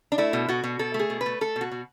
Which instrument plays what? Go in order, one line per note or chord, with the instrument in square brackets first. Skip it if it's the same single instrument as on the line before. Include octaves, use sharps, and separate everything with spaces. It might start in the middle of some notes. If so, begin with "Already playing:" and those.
[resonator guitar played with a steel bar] D4
A3 E4
B2
B2 F#4
B2
B2 A4
A3
G#4
B2
B4
A3
A3 A4
B2
F#4
B2